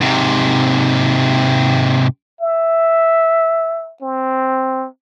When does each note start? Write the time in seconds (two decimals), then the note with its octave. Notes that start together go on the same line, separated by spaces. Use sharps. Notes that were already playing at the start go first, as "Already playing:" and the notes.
0.01 G#2 C3
2.41 E5
4.02 C4